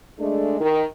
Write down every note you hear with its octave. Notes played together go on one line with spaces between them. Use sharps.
G#3 A3 D4
D#3